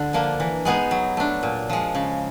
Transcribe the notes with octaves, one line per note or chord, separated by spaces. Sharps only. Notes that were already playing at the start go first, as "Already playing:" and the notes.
Already playing: D3
F3 A#3 D4
E3
G#3 B3 D#4 G#4
F#3
A3 D4
A#2
F3 G#3
C#3